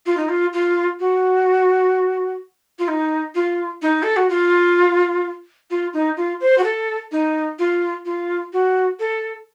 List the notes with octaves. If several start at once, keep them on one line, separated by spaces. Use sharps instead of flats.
F4
D#4
F4
F4
F#4
F4
D#4
F4
D#4
A4
F#4
F4
F4
D#4
F4
C5
F#4
A4
D#4
F4
F4
F#4
A4